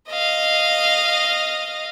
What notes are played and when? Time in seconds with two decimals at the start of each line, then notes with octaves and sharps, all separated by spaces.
0.10 D#5 F5